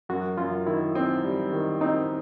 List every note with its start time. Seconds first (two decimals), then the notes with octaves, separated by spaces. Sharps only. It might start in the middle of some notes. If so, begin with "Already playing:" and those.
0.09 F#2 F#4
0.38 F#2 F4
0.66 D#3 E4
0.95 C4
1.24 G3
1.52 D#3
1.81 C4 D#4